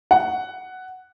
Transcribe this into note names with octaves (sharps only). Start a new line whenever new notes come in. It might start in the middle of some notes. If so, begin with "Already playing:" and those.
F#5